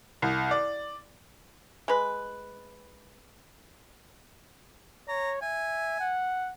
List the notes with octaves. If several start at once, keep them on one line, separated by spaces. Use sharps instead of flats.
C2
D5
G#3 B4
C#5 A#5
E5 G#5
F#5